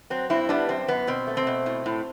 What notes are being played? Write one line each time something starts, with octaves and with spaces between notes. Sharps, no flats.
F#3 C4
G2 C4 E4
G3 B3 D4
F#2 C4
F#2 B3
B2 C4
A3
C4
B2
A2
A2